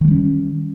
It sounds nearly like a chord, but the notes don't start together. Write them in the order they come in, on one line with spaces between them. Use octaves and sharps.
D#3 G#3 G3 C#4